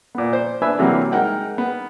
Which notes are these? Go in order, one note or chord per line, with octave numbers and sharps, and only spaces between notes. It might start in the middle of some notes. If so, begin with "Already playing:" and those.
A#2 B3
C5
D4 B4 E5 G#5 B5 E6
C3 E3 F#3 G3 A#3 C4
G#3 D#4 A#4 F#5 G5
B3